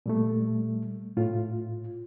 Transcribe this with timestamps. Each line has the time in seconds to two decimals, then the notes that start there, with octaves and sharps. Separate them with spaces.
0.06 A#2 G3 A3
1.17 A2 F4